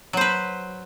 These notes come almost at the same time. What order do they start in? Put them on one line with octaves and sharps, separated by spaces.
F#3 C5 B4